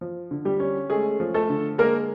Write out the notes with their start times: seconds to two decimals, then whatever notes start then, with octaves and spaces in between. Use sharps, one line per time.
0.01 F3
0.31 D3
0.45 G3 G4
0.60 C#4
0.90 G#3 A3 G#4
1.20 F3
1.34 A3 A4
1.49 D3
1.78 G#3 A#3 A#4